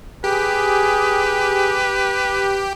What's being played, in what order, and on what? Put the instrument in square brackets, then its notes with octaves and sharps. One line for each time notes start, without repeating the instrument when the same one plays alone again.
[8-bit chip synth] G4 [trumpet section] G#4 [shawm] B4